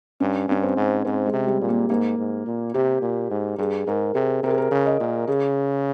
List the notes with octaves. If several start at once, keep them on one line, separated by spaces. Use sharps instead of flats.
G2 C#4
G2 C#4
C4
G#2
G#2 C4
G#3
C3
G3
A#2
A#3
G#2 A#3
G#2
A#2
C3 G4
A#2
G#2
G2 G#4
G#2 A#4
C3 G#4
C3 A#4
G#4
A#4
C#3
D#5
A#2
C#3 G#4